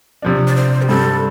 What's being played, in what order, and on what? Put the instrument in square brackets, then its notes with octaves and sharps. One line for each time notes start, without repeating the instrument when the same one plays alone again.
[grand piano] C3 F3 D4
[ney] D5
C5
G4
[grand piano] G2 G3 C4 [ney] A4